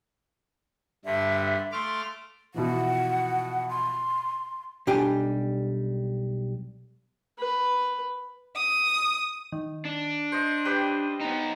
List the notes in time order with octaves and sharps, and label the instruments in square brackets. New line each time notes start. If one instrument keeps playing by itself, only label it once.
[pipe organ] G2 D3 [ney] E5
[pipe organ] A3 D6 F6 [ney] C6
[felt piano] B2 E3 F3 [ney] F#5
[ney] C6
[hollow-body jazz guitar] B1 G3 D4 G4 G5 G#5
[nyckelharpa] B4
[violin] D#6
[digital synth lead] D#3
[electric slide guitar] D4
[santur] C5 D#5 [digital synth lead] C#7
[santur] G3 B4 C5 [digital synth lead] G5
[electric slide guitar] B3 D#4